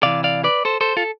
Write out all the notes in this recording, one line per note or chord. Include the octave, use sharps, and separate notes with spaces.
C3 E3 D5 F5
D5 F5
B4 D5
A4 C5
A4 C5
F4 A4